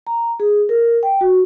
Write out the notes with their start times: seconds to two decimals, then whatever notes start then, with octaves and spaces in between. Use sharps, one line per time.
0.07 A#5
0.40 G#4
0.69 A#4
1.03 G5
1.21 F#4